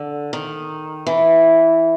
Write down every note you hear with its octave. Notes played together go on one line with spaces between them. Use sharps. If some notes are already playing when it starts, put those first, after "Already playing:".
Already playing: D3
D#3
E3